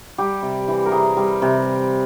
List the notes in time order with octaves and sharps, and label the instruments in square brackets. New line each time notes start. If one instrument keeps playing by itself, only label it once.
[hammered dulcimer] G3 G4
C3
E3
A#4
C3 G#4
G3
C3